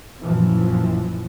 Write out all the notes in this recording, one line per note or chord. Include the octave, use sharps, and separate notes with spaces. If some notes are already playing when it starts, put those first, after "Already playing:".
A#1 F#2 E3 F3